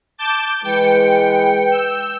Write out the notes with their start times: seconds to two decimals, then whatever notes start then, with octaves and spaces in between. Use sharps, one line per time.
0.18 A5 D6 G6
0.64 E3 G#3 B4 G5 C#7
1.69 E6 G6